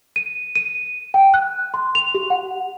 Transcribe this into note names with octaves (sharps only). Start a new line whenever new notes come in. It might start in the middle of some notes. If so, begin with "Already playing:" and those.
D#7
D#7
G5
F#6
C6
F7
G4
F#5